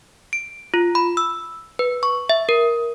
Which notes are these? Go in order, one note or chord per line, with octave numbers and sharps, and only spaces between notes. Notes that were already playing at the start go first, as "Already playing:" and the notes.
D7
F4
B5
E6
B4
C#6
E5
A#4